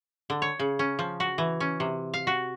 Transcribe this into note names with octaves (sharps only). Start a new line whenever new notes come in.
D3
C#5
C#3
C#4
F3
F#4
E3
C#4
C3
F5
F#4